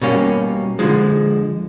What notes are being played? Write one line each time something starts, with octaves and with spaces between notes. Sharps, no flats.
B2 G3 A#3 C#4
D3 F3 G#3